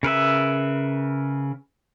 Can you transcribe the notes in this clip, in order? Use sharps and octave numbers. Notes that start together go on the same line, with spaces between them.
C#3 A#4 B4 E5